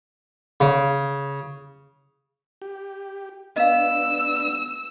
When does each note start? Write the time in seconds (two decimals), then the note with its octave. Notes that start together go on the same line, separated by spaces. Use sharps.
0.61 C#3
2.62 G4
3.56 B3 D4 D#5 F5 E6